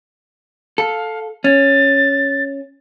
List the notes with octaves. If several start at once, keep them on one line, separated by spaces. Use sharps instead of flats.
A4 F5
C#4 A6